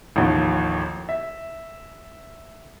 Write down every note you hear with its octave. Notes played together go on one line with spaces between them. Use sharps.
A1 D#2 F3
E5